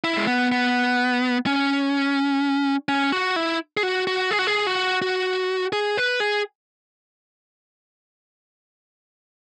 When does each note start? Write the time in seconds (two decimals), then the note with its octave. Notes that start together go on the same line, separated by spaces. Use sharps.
0.04 E4
0.17 G#3
0.27 B3
0.52 B3
1.46 C#4
2.89 C#4
3.12 F#4
3.36 E4
3.77 G#4
3.83 F#4
4.07 F#4
4.31 G#4
4.39 F#4
4.47 G#4
4.67 F#4
5.02 F#4
5.73 G#4
5.97 B4
6.20 G#4